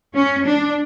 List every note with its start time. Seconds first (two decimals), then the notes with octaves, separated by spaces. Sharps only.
0.15 C#4
0.46 D4